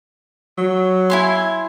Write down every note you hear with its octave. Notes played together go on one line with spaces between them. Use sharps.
F#3
E4 G#5 C6